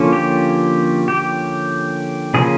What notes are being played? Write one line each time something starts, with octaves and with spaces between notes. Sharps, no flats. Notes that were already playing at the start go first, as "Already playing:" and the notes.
Already playing: D3 F3 A#3 C#4
G4
G4
C#3 F3 A#3 C#4 G#4